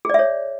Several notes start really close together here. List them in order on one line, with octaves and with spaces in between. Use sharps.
G#4 D5 E5 C#5